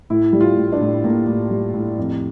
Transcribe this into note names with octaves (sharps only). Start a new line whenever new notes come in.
A2 E4
G3
F4
A2
D4
A2
A2 A#3
A2
G3
A2
F2